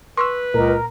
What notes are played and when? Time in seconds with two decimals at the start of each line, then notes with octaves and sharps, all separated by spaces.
0.17 B4 C6 C#6 E6
0.54 C#2 A#2 A#4